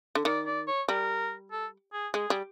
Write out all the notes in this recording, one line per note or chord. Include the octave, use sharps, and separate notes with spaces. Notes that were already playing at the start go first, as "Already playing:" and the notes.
D3
D#3 D5
D5
C#5
G3 A#4
A4
G#4
G#3 G#4
G3